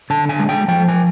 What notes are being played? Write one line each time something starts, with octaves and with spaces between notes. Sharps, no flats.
D3 A5
G#5
G#3
G5
F3 G5
G#5